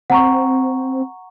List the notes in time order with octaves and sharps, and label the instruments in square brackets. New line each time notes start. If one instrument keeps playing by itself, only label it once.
[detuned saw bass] C4 [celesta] F#5 A#5 C#6